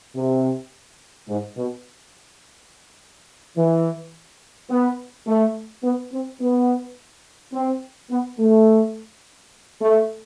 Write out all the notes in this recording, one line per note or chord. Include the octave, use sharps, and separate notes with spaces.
C3
G#2
B2
E3
B3
A3
B3
C4
B3
C4
B3
A3
A3